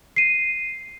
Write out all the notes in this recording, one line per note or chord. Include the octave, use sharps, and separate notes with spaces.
C7 D#7